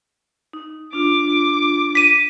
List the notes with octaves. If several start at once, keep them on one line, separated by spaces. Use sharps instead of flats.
D#4
D4 F4 D6
B6 D#7